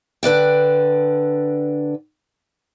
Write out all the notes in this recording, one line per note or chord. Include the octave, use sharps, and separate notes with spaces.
D3 B4 D5 G5